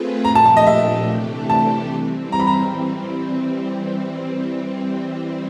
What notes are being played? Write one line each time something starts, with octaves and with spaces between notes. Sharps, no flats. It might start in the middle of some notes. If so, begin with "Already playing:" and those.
Already playing: A3 C4 F4 G#4 B4
A#2 F3 A3 D4 G4 A#5
A5
A5
D#5
E5
C3 E3 A3 D4 G4
A5
E3 G3 C4
A#5
B5
A#5